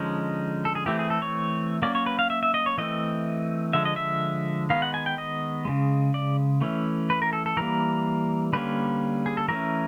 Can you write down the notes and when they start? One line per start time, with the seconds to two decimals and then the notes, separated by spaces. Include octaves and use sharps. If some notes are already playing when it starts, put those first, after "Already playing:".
Already playing: D3 F3 G#3 C#4 D#4
0.65 A4
0.75 G#4
0.86 E3 A3 C4 G4
0.99 G#4
1.10 A4
1.22 C#5
1.82 F#3 A#3 C#4 D5
1.95 C#5
2.06 B4
2.19 F5
2.30 E5
2.43 E5
2.54 D#5
2.66 C#5
2.78 E3 A3 C4 D#5
3.73 D3 F3 G#3 E5
3.85 D#5
3.96 E5
4.70 D#3 G#3 B3 F5
4.82 F#5
4.94 G#5
5.06 G5
5.18 D#5
5.65 C#3 F3 G#3
6.14 D5
6.61 E3 A3 C#4
7.10 B4
7.22 A#4
7.33 A4
7.46 A4
7.57 E3 G3 A#3 A#4
8.53 D3 G3 A#3 C#4 B4
9.26 G#4
9.37 A4
9.48 E3 A3 C#4 A#4